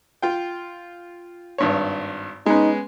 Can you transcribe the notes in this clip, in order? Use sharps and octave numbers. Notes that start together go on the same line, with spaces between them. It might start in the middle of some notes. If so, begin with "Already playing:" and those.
F4 G5
G#1 G2 C#5
G#3 B3 C#4 D#4